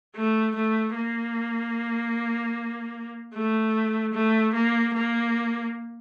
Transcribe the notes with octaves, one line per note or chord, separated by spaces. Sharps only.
A3
A3
A#3
A3
A3
A#3
A#3